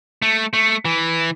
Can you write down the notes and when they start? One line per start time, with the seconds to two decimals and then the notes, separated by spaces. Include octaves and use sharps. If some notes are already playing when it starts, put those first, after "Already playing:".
0.22 A3
0.53 A3
0.85 E3